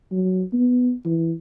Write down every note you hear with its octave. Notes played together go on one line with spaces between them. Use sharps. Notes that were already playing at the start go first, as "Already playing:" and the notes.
F#3
B3
E3